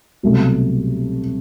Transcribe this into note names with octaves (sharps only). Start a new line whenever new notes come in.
C2 B2 F#3 A3